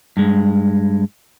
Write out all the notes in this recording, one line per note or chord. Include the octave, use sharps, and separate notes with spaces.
G2 G#3